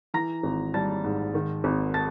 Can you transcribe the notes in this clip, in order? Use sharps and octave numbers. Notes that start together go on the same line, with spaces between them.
E3 A#5 A#6
G#1
G3 A5 A6
G#2
D#3
G#1
A5 A6